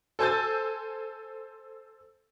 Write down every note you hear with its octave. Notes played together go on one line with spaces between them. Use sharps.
A4 C5 G#5 E6 G6 A6